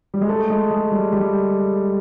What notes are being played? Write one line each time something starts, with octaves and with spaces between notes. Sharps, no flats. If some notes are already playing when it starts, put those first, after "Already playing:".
G3
G#3
A3
G#3
G#3
G3
G3